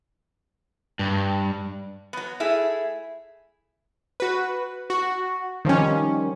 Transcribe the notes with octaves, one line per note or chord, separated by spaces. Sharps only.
G2
F#3 B3
A3 E4 G#4 E5
F#4 B4
F#4
D#3 F3 G3 C#4